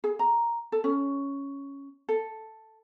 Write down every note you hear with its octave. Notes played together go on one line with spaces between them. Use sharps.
G#4
A#5
A4
C#4
A4